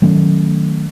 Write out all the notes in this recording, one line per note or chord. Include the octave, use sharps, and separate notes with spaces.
D#3 F#3 A3 C#4